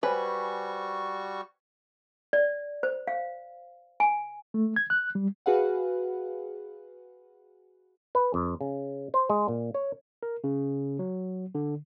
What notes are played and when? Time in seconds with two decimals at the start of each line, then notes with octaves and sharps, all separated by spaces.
0.03 G3 F#4 B4 C5 G#5 B5 C#6
2.33 D5
2.83 C5
3.07 F5
4.00 G#5
4.54 A3
4.76 G#6
4.90 F#6
5.15 G3
5.46 F#4 G#4 B4 F5 F#5
8.15 B4
8.34 F2
8.61 C#3
9.14 C5
9.30 G#3
9.48 A#2
9.74 C#5
10.23 A#4
10.44 C#3
10.99 F#3
11.55 D3